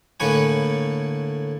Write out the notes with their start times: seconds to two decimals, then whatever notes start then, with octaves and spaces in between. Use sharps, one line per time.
0.20 A2 D3 A#3 B4 C#5 G#5